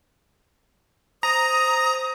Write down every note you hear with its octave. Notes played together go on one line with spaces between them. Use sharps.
C5 A#5 D#6